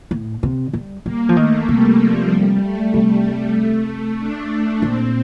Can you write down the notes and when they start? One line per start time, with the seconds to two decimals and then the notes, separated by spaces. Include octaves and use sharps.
0.11 A2
0.43 C3
0.73 G3
1.05 G3 A#3
1.29 F3
1.37 D#3 A3
1.68 C3 G3
2.00 F3
2.31 G3
2.62 A3
2.94 C3
4.19 D4
4.82 A#2 C4